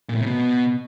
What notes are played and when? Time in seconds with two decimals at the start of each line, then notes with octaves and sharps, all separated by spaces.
0.09 A#2
0.15 A2
0.21 C3
0.26 B2